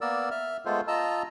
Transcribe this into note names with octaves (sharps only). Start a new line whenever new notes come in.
A#3 B3 A#4 D5 E6
E5 F6
G#3 A3 B3 F4 A4 C5
F4 D#5 A5 A#5 E6